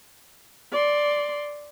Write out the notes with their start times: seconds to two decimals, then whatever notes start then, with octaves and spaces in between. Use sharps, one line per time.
0.71 D5 C6